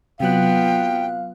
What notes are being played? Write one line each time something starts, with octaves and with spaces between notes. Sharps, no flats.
C3 F#3 B3 F4 F5 G5 F#6